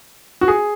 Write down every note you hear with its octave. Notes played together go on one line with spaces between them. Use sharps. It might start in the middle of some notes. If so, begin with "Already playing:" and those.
F#4
G#4